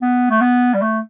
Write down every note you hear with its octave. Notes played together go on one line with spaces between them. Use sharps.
B3
A3
B3
G3
A3